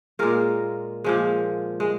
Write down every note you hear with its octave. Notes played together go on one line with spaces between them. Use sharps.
A#2 G#3 F4 A#4
A#2 F3 G#3
G#3